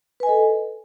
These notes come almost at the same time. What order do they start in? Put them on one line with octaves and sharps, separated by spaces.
B4 G#5 D#5 A4